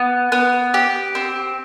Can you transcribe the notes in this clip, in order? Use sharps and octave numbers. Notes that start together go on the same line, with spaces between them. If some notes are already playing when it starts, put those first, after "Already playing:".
Already playing: B3
B3
G4
C4